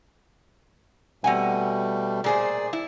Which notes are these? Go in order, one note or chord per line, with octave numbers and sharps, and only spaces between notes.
B2 G3 A3 C4 F#5 G#5
A#2 G#4 C5 D5
E4